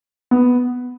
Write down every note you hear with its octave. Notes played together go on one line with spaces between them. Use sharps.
B3